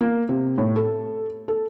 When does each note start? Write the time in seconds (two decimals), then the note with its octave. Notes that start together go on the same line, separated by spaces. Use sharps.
0.01 A#3
0.29 C3
0.58 A2
0.76 A4
1.48 A4